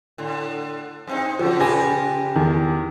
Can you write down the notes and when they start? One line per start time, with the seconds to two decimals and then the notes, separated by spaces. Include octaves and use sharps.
0.18 A2 D3
1.07 F#2 C4 D#4
1.39 C#3 F3 F#3
1.60 C#3 G4 B4 G#5 A#6
2.36 E2 D#3